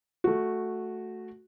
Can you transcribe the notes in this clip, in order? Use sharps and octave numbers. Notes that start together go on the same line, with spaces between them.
A3 F#4